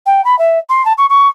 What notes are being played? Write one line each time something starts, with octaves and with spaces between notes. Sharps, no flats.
G5
B5
E5
C6
A5
C#6
C#6